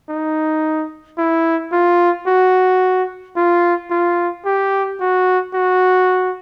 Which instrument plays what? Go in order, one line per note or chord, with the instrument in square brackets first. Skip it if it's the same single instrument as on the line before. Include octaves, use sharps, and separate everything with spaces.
[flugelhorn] D#4
E4
F4
F#4
F4
F4
G4
F#4
F#4